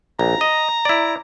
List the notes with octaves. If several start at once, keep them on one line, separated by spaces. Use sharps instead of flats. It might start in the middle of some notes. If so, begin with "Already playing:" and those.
A#1 A#5
D#5
E4 D5